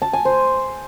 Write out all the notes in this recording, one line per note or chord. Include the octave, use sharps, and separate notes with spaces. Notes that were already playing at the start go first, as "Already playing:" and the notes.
A5
G#5
C5